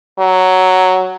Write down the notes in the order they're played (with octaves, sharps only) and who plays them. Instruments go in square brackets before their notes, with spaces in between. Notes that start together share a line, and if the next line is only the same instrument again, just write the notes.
[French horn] F#3